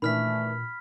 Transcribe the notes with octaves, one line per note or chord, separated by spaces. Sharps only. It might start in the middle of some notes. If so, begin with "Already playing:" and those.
A#2 D#3 E3 A3 D4 B5 F6 B6